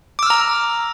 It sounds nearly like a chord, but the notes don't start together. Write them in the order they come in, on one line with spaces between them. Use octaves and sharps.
D6 E6 F6 A#5